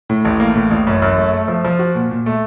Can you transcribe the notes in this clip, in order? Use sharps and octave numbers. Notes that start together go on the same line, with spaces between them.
A2
A1
A#3
A2
A1
F#2
F#2
A3
A3
F3
F3
F#4
A#2
A#2
A3